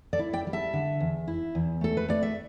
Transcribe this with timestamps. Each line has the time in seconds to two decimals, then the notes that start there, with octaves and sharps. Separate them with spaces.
0.13 A4 D5
0.19 E4
0.33 D5 G5
0.47 G3
0.53 E5 A5
0.73 D3
1.00 E2
1.28 E4
1.55 E2
1.81 A3 A4
1.97 B4
2.08 A3 D5
2.23 E5